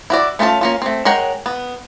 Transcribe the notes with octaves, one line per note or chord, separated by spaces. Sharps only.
E4 F#4 D5
A3 C#4 F4 A#4 A5
A#3 C#4 F4
A3 C4
G#3 A#4 C#5 F#5 G5
B3